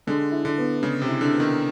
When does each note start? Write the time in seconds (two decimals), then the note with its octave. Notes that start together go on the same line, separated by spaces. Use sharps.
0.07 D3 G#3
0.32 E4
0.45 D3
0.58 B3
0.82 C#3 G#3
1.02 C3
1.08 E4
1.21 D3
1.34 B3
1.40 D#3